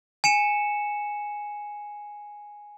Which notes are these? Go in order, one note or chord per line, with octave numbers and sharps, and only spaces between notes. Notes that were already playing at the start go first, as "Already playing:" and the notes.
G#5 C#7 E7